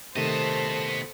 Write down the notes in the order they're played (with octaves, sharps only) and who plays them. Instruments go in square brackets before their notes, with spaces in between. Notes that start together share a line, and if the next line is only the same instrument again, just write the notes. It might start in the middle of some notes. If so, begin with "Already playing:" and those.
[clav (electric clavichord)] C3 D#3 A3 [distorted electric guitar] B3 D#5 [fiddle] A4 A5 [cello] C5